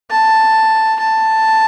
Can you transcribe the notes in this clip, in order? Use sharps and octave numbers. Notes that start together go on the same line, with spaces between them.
A5
A5